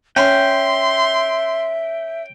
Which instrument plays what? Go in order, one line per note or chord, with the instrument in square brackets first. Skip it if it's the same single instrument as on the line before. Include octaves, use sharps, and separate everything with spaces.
[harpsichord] C#4 [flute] E5 [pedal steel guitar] G5 [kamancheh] C6